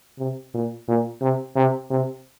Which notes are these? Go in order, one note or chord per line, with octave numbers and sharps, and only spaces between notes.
C3
A#2
A#2
C3
C3
C3